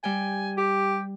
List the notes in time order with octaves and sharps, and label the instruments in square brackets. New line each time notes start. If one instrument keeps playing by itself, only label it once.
[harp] G3 G5 [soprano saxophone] G#5
[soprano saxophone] G4